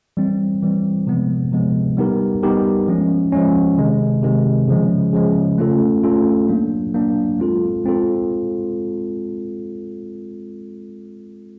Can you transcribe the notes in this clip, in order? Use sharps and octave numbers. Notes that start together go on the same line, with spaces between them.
E3 G3 C4
E3 G3 C4
C3 F3 G#3 B3
C3 F3 G#3 B3
G3 B3 D#4 G4 A#4
G3 B3 D#4 G4 A#4
F3 G#3 C#4
F3 G#3 C#4
C3 D#3 G#3
C3 D#3 G#3
C#3 F3 G#3
C#3 F3 G#3
A3 C#4 F4 A4
A3 C#4 F4 A4
F#3 A#3 D4
F#3 A#3 D4
G#3 C4 F4 A4
G#3 C4 F4 A4